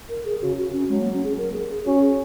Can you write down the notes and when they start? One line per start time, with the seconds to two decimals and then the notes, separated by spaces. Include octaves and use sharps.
0.09 A#4
0.25 G#4
0.42 C#3 F#4
0.58 F#4
0.73 C#4
0.89 F#3 G#3
1.00 A#3
1.13 C#4
1.24 G#4
1.38 A#4
1.53 G#4
1.68 G#4
1.85 C#4 F#4
2.02 G#4